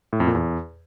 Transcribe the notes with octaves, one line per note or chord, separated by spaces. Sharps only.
A2
F2
A#2
E2